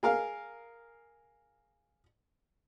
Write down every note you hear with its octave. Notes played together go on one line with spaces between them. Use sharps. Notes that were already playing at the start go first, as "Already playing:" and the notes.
G#4 A#4 F5